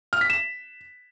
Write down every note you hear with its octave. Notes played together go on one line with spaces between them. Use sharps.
F6
B6
E7